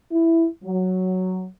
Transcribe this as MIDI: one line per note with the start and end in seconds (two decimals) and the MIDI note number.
0.12 0.46 64
0.64 1.46 54